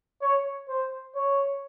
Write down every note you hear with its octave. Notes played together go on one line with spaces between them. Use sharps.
C#5
C5
C#5